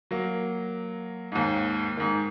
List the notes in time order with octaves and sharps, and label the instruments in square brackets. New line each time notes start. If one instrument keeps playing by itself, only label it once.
[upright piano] F#3 A#3
D#2 G#2
G#2 D#3